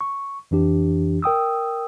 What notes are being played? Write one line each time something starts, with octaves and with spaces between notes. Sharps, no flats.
C#6
F2 E3 D4 G4
A#4 G5 D#6 E6